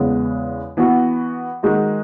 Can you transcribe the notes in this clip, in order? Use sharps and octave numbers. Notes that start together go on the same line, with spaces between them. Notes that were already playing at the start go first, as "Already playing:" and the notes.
Already playing: E2 C#3 G#3 B3
E3 B3 F#4
D#3 G#3 D#4 F#4